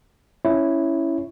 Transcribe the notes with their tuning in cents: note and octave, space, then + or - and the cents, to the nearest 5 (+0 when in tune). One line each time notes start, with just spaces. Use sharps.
C#4 +0 E4 +0 C#5 +0